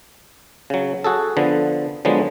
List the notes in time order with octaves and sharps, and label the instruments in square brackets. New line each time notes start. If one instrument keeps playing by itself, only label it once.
[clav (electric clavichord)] C#3 F#3
F#4 G#4 A4
D3 F3 B3
D3 F3 F#3 G#3 B3